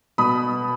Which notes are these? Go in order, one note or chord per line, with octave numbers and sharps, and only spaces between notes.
B2 B5 D#6